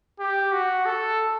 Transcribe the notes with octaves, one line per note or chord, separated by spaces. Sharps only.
G4
F#4
A4